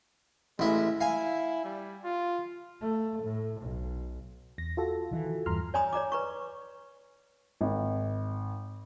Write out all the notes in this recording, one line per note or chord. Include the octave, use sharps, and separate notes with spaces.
A1 G#3 E4
E4 F5 G#5
G3
F4
A3
A2
B1
E2 A#6
F4 F#4 A4
D#3 E3
E2 G2 E3 A#5 C6 F6
C#5 D5 G#5 A#5 C6 D#6
C#5 D5 A#5 D6
B4 A#5 C#6
G#1